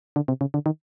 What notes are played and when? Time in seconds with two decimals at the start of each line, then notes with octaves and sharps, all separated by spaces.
0.16 D3
0.28 C3
0.41 C#3
0.54 D3
0.66 D#3